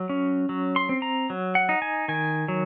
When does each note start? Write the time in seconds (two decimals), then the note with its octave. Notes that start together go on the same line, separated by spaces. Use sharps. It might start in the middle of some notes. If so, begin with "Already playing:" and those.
Already playing: F#3
0.09 C#4
0.49 F#3
0.76 C6
0.89 C4
1.02 A#5
1.30 F#3
1.55 F#5
1.69 D#4
1.82 G#5
2.08 D#3 G#5
2.48 F#3